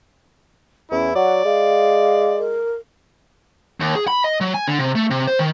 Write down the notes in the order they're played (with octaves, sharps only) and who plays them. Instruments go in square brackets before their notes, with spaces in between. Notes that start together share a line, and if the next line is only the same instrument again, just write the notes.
[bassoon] E2 [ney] C#4 [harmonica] E4
[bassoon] F#3 [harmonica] D5 [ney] F#5
[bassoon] G#3 [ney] F5
[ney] A#4
[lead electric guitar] D#2
G#4
B5
D#5
F#3
G#5
D3
C3
A3
C3
C5
D#3